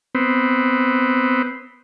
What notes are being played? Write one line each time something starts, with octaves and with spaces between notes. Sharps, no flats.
B3 C4